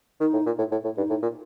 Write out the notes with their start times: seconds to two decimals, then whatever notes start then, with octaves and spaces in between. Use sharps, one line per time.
0.20 D#3 D#4
0.33 A2
0.46 A#2
0.58 A2
0.72 A2
0.84 A2
0.96 G2 D#4
1.10 A2
1.22 A#2